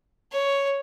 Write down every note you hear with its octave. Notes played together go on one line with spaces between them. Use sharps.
C#5